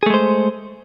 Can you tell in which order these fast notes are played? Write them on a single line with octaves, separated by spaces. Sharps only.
G#4 A3 G#3 C5